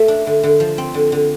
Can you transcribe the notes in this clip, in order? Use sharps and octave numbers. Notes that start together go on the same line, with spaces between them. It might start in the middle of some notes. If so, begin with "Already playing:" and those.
Already playing: A3
D4
D3
D3
F3
C4
D3
D3